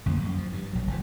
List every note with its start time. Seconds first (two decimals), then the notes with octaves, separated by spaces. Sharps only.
0.06 A1 F2 D3 A#3
0.24 F#2
0.38 F3
0.53 G2
0.73 A#1 F#3
0.87 F#1 G2 E3